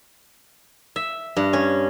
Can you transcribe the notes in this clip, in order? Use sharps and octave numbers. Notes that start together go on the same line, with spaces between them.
E5
G2
C#4